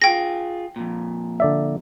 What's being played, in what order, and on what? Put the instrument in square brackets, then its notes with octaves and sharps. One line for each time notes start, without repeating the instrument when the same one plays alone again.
[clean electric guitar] F4 G#4 [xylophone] G5 A#6
[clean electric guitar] F2 A#2
[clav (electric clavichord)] D3 D5 E5